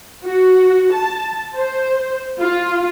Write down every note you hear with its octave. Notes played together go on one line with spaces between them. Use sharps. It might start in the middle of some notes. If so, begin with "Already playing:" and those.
F#4
A5
C5
F4